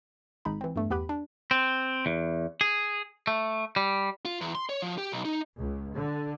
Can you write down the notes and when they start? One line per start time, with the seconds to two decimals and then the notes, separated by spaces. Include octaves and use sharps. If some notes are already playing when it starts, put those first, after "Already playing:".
0.45 G#1 G#3 D#4 B5
0.61 E3 C4
0.76 E2 G2 A3
0.90 E2 B3 G4 B4 B5
1.09 D4
1.51 C4
2.06 E2
2.61 G#4
3.27 A3
3.76 G3
4.25 F4
4.41 E2
4.55 C6
4.69 C#5
4.82 F3
4.98 G4
5.12 B1
5.25 D#4
5.58 C#2
5.94 D3